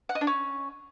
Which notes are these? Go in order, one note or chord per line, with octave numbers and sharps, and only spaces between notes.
F#5
D#5
D4
C#4